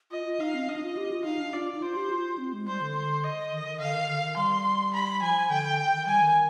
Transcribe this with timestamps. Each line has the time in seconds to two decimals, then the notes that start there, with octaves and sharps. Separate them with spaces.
0.11 F4 D#5
0.26 F4
0.40 D#4 F5
0.54 C4
0.69 D4 D#5
0.76 D#4
0.83 F4
0.97 G4
1.11 F4
1.25 D#4 F5
1.39 D4
1.53 F4 D5
1.75 D#4
1.82 F4 C5
1.96 G4
2.10 F4
2.38 C4
2.53 G#3
2.67 G3 C5
2.81 D3
2.95 C5
3.24 D#5
3.52 D#3
3.66 D#3
3.80 D3 F5
3.94 D#3
4.09 D3
4.23 D#3
4.37 G3 C6
4.94 B5
5.22 F3 G#5
5.50 D3 G5
5.93 D#3
6.07 G3 G#5
6.21 D#3